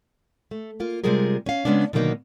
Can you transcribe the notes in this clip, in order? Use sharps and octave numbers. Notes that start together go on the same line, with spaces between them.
A3
A#3 F4
C3 G3 G#3 F4 G#4 A#4
C#4 F5
C#3 G#3 B3 C#4 D4
B2 D3 D#3 F#3 A#3 D#4